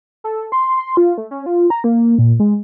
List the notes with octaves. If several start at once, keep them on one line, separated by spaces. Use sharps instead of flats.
A4
C6
C6
F4
A3
C#4
F4
A#5
A#3
A#2
G#3